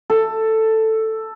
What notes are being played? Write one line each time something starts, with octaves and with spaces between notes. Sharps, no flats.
A4